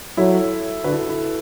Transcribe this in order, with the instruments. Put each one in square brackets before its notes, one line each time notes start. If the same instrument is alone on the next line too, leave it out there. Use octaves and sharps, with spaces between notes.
[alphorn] F#3 [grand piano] E4 A4
[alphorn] D3 [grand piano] F#4 B4
[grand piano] E4 A4
E4